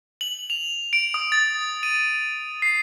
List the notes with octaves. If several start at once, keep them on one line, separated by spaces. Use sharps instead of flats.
F#7
F7
D7
D#6
A6
D#7
C7